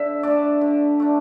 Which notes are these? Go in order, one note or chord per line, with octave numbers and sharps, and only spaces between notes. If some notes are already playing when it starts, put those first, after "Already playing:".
Already playing: D3 E5
A3 D4 D5
D3
A3 D4